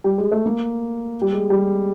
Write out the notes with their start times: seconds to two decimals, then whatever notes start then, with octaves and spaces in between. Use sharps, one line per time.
0.04 G3
0.18 G#3
0.31 A3
0.46 A#3
1.22 G3
1.33 G#3
1.50 G3